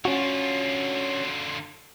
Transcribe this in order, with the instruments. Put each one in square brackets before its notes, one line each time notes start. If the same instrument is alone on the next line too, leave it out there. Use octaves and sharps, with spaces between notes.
[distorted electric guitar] D3 F4 [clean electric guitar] C#4 F#4